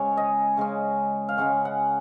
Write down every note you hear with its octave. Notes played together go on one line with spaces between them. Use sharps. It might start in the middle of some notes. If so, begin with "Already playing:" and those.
Already playing: C#3 G#3 C#4 C#5
D#5
C#3 G#3 C#4
F5
C#3 G#3 C#4 F#5
F#5